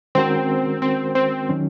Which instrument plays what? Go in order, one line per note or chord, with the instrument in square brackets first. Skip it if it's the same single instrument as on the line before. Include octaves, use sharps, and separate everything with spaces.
[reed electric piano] D#3 G#3 C#4 F#4 A#4 [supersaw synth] C4
[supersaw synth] C4
C4
[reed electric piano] D#3 F#3 C#4